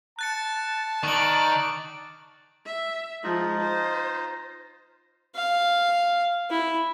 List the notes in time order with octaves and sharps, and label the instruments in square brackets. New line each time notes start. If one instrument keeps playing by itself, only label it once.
[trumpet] A5 [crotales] F#6 A6 C#7
[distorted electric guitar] D#3 [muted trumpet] D5 [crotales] C#6 F#7
[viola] E5
[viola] F3 G#3 [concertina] D#4 F4 D#5
[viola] C5
[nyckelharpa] F5
E4